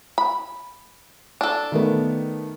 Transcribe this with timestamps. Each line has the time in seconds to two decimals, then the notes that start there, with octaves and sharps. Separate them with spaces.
0.18 B5
1.41 D4 A4
1.72 D#3 A3 B3